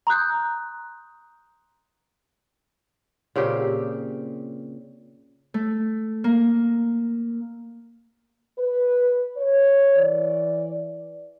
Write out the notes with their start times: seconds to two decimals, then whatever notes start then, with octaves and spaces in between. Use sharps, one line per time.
0.07 A#5 C6 D#6 F#6 G6
3.36 A#2 C#3 C4 G4
5.54 A3
6.24 A#3
8.58 B4
9.37 C#5
9.95 E3 D5